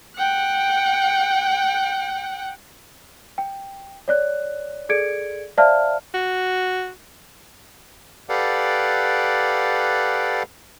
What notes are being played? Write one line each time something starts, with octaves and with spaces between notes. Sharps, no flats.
F#5 G5
G5
C#5 D5 F#6
G#4 A4 D5 G#6 C#7 D7
C5 D5 E5 F5 A5 F6
F#4
G4 A4 B4 D5 F5 F#5